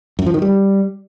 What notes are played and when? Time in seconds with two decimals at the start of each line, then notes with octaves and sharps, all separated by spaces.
0.19 F#2
0.26 F3
0.34 D#3
0.42 G3